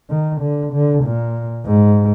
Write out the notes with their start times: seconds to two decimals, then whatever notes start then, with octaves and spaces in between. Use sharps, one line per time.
0.10 D#3
0.41 D3
0.72 D3
1.03 A#2
1.66 G#2